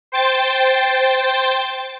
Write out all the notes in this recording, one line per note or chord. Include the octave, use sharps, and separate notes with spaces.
C5 G5 A6